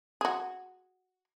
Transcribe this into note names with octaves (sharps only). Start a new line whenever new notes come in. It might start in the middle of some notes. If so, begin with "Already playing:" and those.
F#4 G#4